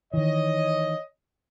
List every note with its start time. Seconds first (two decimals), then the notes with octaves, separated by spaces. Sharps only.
0.14 D#3 E3 C#5 D#5